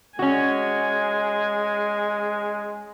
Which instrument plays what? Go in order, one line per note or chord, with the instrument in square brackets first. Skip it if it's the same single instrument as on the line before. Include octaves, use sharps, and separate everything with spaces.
[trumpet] G#3 [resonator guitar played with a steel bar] C#4 F#4 [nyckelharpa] G#5